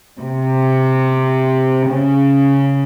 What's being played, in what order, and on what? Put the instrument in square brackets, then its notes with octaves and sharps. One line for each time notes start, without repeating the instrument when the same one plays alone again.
[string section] C3
C#3